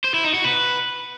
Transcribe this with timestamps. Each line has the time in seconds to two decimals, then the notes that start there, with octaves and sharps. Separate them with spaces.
0.04 C5
0.14 E4
0.24 D#4
0.34 F#4
0.44 B4